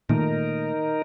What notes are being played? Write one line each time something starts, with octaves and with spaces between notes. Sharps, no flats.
A#2 D#3 A3 D#4 A#4